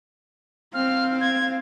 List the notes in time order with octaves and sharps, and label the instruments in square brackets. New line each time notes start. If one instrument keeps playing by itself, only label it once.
[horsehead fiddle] C4 F5 [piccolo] F6
[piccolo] G#6